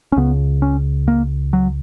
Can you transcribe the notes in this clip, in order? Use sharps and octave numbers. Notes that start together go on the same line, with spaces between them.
C#4
C#2 C#3 B3
C#4
A#3
F#3